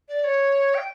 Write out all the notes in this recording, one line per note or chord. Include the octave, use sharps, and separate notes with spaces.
D5
C#5
G5